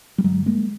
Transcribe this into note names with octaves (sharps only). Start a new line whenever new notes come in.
G3
G2 D3 F#3 G#3
G#3 A#3